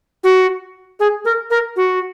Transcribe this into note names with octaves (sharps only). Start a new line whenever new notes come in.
F#4
G#4
A#4
A#4
F#4